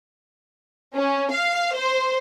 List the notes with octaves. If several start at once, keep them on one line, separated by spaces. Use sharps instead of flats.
C#4
F5
C5